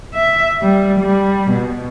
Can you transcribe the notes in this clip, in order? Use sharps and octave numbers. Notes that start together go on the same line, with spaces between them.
E5
G3
G3
B2